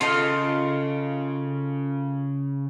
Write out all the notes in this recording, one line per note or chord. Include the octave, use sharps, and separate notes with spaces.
C#3 F4 A4 D#5